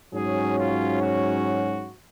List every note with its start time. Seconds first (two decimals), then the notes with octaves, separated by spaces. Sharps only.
0.14 G#2 F#3 C#4 G#4
0.59 F4
1.02 F#4